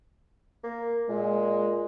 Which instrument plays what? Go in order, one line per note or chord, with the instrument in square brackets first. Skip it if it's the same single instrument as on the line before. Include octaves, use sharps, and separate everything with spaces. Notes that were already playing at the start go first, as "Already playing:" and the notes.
[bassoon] A#3
[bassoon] A#2 [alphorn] G#3